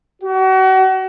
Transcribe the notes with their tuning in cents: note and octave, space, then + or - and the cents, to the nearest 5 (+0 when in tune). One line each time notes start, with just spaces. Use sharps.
F#4 +35